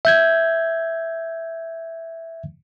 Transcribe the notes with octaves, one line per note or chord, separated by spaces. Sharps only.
E5 G6 G#6